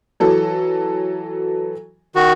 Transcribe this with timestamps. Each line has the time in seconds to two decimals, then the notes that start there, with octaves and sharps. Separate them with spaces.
0.20 E3 F#3 A4
2.16 D#3 F#4